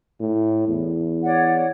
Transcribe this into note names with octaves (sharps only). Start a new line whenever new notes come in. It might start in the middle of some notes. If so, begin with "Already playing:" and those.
A2
E2
C#5 D5 F#5